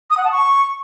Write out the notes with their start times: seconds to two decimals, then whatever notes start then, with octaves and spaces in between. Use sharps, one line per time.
0.10 D#6
0.17 F#5
0.25 A5
0.32 C#6